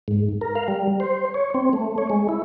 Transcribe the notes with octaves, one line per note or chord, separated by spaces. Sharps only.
G#2
A#4
F5
G3
C5
C#5
C4
A3
C#5
G#3
E4